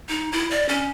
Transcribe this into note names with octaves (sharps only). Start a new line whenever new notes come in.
D#4
E4
D5
C#4